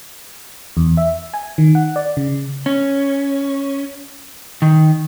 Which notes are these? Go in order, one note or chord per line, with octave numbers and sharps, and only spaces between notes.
E2
E5
G#5
D#3
F#5
D5
C#3
C#4
D#3